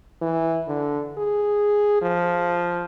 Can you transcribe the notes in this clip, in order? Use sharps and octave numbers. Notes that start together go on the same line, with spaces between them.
E3
D3
G#4
F3